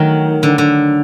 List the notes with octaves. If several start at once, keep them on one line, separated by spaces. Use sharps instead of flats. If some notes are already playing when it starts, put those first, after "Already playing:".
Already playing: D#3 F#3 A3
D3
D3